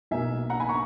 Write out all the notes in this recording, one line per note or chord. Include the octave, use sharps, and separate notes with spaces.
B1 B2 A#3 D#4 E5 G#5
F#5 A#5
G#5 B5
A#5 C#6